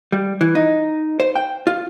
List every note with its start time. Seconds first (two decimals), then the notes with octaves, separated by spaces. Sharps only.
0.12 G3
0.41 E3
0.55 D#4
1.20 C5
1.36 G5
1.67 F4